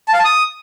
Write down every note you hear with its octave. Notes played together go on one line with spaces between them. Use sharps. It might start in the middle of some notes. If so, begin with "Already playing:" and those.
A5
F5
A5
D#6